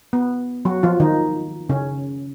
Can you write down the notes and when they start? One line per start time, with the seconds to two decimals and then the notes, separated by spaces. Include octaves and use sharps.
0.13 B3
0.65 F#3 F#4
0.83 F3 F4
1.00 D#3 D#4
1.69 C#3 C#4